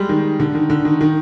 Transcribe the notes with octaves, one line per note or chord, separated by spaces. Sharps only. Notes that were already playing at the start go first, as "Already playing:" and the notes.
Already playing: G3 G#3
D#3
D3
D#3
D3
D#3
D#3